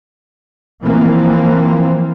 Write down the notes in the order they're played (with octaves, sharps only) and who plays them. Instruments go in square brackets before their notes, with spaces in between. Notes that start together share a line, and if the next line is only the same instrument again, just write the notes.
[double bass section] E3 F3 A#3 C4